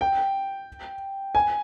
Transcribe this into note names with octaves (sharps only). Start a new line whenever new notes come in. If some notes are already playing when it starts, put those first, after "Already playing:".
G5
G#5